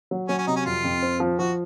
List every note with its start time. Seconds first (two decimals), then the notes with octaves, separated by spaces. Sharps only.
0.11 F#3
0.29 F#3 C#4
0.39 C#4
0.47 C3 D#4
0.56 C#4
0.65 F2 F4
0.84 F2
1.02 C4
1.20 F3
1.39 F3 F#4